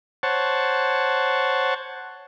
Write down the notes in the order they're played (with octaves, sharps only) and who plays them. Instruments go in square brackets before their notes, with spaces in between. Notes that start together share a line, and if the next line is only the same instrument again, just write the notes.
[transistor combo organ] C5 C#5 F#5 A5